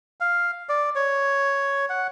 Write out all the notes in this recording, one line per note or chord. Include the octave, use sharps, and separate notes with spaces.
F5
D5
C#5
F#5